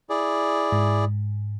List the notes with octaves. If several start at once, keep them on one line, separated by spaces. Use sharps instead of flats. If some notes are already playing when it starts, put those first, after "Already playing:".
E4 G#4 D5
G#2